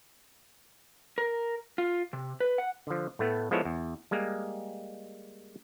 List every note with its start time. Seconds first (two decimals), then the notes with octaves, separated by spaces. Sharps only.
1.18 A#4
1.78 F4
2.13 C3
2.40 B4
2.58 F#5
2.87 D3 F3
3.19 A2 A3 B3
3.51 F3 G#3 B3 E4 A4 C#5
3.65 E2
4.11 G3 G#3 A#3